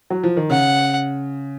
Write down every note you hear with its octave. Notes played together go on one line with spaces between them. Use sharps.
F#3
F3
D#3
C#3 F#5